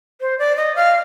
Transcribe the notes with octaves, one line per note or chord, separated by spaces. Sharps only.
C5
D5
D#5
F5